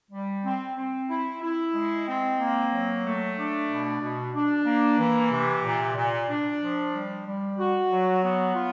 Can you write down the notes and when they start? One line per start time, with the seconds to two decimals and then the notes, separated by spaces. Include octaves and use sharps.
0.11 G3
0.44 C4
0.77 C4
1.09 E4
1.42 E4
1.74 G#3
2.07 C4
2.39 A#3
2.72 F#3
3.04 A3
3.37 D4
3.69 B2
4.01 B2
4.34 D4
4.65 A#3
4.98 E3
5.31 C3
5.63 A#2
5.96 A#2
6.28 D4
6.61 F3
6.93 G3
7.26 G3
7.58 F#4
7.90 F#3
8.22 B3
8.56 F4